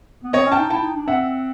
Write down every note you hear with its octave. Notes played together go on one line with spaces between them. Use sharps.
B3
C4 C#5 D#5
C#4
G5 A5
D#4
E4 G5 A5
D#4
D4
C4 E5 F#5